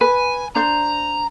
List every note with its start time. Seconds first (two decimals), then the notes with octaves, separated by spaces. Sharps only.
0.01 B4 G#5
0.55 D4 C5 A#5